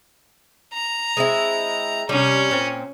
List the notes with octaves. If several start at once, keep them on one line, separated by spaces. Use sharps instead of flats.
A#5
G#3 C4 E4
C3 G3 C#4
A#2 C4